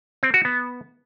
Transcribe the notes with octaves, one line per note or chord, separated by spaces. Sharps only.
C4
F#4
B3